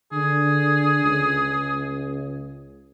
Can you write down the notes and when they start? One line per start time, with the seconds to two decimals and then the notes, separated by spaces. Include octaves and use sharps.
0.13 D3 G#4
1.04 C#2